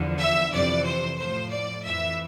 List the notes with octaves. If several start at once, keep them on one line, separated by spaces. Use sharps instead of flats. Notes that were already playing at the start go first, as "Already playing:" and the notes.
Already playing: E2 D3 F3
E5
F2 C3 E3 D5
C5
A2 F3 C5
D5
F2 E3 E5